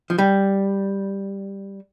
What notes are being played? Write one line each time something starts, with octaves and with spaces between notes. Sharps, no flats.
F3
G3